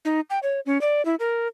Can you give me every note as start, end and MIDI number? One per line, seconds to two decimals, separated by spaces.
0.05 0.20 63
0.30 0.39 79
0.43 0.60 73
0.66 0.80 61
0.81 1.04 74
1.05 1.15 64
1.20 1.48 70